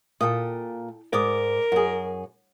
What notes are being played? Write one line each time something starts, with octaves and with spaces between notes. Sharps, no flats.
A#2 A4 G5 D#6
G#2 A#4 D5 D6 D#6
F#2 F#4 G#4